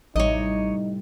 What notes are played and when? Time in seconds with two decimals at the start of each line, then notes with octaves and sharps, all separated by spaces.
0.16 A1 A2 C3 G3 D#4 C#5 D#5